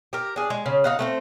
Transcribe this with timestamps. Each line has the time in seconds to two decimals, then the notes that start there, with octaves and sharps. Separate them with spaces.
0.13 G4 A#4
0.36 D4 G#4
0.50 G#3
0.66 C#3
0.84 D#4 F5 F#5
0.99 A3 B3 C4